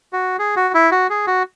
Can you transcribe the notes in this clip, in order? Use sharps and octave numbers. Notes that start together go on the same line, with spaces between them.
F#4
G#4
F#4
E4
F#4
G#4
F#4